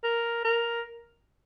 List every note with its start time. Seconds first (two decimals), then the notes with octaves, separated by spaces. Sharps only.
0.04 A#4
0.45 A#4